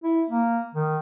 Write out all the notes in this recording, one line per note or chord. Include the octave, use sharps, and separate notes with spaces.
E4
A#3
D#3